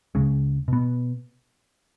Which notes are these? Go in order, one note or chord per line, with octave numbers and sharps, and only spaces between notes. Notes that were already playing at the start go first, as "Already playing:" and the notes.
C#2 C#3 G#3 C#4
B2 B3